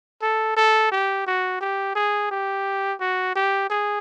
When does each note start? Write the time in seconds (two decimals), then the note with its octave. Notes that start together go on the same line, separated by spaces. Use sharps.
0.22 A4
0.57 A4
0.91 G4
1.27 F#4
1.61 G4
1.95 G#4
2.31 G4
3.00 F#4
3.35 G4
3.70 G#4